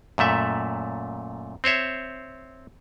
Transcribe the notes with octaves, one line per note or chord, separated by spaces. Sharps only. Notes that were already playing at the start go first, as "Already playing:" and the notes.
F#2 A#2 A3 E5
C4 C5 C#5 E5